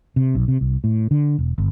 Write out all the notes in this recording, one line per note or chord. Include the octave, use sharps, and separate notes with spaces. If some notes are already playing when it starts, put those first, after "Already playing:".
C3
B1
C3
C2
A2
D3
E1
G1